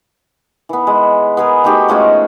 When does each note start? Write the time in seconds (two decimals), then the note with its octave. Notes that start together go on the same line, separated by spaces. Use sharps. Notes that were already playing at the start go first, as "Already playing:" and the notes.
0.69 E3 B3
0.87 G#3
1.37 B3 G#4 A#4
1.64 A3 D#4 F#4 G4
1.88 F3 G#3 A3 C#4